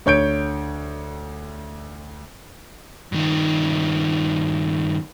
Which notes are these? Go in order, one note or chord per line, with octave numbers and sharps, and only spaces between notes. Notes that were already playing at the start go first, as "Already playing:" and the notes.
D2 C#5 G6 D7
G2 D#3